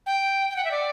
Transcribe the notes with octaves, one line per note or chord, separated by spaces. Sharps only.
G5
G5
F#5
E5
D5